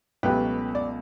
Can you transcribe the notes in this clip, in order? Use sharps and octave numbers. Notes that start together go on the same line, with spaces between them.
C#2 B2 F#3 A3 G4 B4
D5